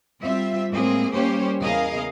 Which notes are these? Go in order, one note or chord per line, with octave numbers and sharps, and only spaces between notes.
G3 C4 F4 E5
A2 G#3 A#3 C4 G#4
G3 A#3 C#4 G4 C5 C#5
E2 C#3 G#4 A#4 D#5 F5